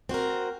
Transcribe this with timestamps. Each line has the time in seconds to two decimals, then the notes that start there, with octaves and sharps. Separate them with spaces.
0.09 C4 F#4 A#4